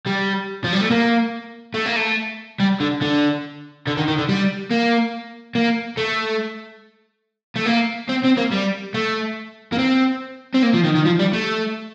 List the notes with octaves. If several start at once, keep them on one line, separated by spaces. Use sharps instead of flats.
G3
F3
G3
A3
A#3
A3
A#3
A3
G3
D3
D3
D3
D#3
D#3
D3
G3
A#3
A#3
A3
A3
A#3
C4
C4
A#3
G3
A3
A#3
C4
C4
A#3
F3
D#3
D#3
F3
G3
A3